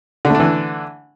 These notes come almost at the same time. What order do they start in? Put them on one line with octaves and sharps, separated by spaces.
D3 A3 D4 E3